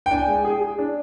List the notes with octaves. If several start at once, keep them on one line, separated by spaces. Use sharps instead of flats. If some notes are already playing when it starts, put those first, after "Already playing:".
G5
D4 G#5
G#3
G#4
G#4
D4